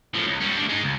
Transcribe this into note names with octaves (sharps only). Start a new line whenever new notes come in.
A2 F3
C#2
G3 C#4
D2 D4
G#3 D#4
C#2